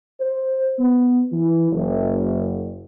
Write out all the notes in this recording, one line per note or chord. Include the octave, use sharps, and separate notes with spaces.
C5
B3
E3
F#1